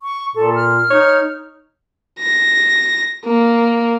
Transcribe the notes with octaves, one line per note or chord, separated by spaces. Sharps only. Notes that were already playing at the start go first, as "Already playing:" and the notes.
C#6
A#2 A4
F6
D#4 C#5
A#6
A#3